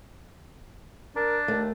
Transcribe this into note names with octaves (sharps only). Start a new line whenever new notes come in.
D4 A#4
D#2 A3